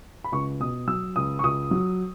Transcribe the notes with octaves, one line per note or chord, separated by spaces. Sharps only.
B5
C#2 C#6
B2 D#6
F#3 E6
C#2 D#6
C#6
C#2 D#6
F#3